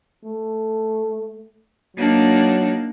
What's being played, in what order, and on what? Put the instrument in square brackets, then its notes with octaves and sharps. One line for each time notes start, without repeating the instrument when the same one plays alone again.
[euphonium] A3
[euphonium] F#3 [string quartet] A#3 D4 D#4